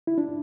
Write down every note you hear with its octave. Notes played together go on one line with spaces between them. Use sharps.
E4
D4